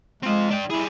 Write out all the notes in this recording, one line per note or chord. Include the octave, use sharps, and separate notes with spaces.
G#3 C4 F4
D4 G5
G3 E4 G#4